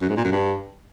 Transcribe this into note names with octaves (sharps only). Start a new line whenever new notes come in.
F#2
G#2
A#2
F#2
G2